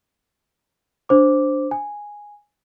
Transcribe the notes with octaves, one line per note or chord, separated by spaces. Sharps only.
D4 C5 D6
G#5